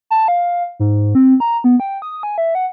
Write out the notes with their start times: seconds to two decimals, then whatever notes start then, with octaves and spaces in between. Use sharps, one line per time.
0.11 A5
0.28 F5
0.80 G#2
1.15 C4
1.40 A#5
1.64 B3
1.80 G5
2.02 D#6
2.23 G#5
2.38 E5
2.55 F#5